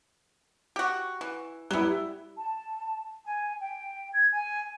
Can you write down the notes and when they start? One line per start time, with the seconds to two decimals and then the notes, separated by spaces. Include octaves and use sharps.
0.76 F#4 G4
1.21 E3
1.71 F#3 G3 B3 E4
2.36 A5
3.25 G#5
3.60 G5
4.13 G#6
4.32 G#5